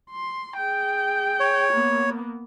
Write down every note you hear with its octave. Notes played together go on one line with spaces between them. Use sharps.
C6
G#4 G5
C#5
A#3 B3